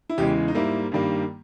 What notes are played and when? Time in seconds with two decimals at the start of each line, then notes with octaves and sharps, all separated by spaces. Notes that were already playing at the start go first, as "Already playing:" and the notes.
0.10 E4
0.18 E2 C#3 E3 G#3 G4
0.48 D#4
0.55 G#2 G3 A#3 E4
0.92 G2 D#3 G3 A#3